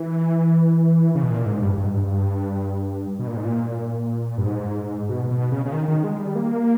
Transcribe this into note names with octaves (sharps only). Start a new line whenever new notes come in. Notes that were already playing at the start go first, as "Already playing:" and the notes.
Already playing: E3
C#3
B2
A#2
G#2
G2
G2
G#2
G2
B2
A#2
G#2
A#2
G2
G#2
B2
B2
C#3
C#3
D#3
D#3
G#3
G3
A#3